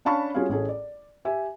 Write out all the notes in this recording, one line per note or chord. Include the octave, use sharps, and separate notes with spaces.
C#4 D4 F5 A5 B5 C#6
G3 C#4 F4 F#4 G#4 F5
A1 C#4 G#4 A4
D5
G4 E5 G#5